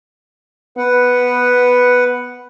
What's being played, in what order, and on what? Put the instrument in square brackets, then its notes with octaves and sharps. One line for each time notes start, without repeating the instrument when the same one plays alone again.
[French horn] B3 [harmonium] B4 F#5